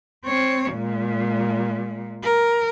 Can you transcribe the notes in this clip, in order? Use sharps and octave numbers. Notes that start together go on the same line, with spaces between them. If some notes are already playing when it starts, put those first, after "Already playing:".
C4 C#5
A#2 G#3
A#4